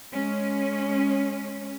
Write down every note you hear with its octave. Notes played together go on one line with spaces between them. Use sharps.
G#3 C#4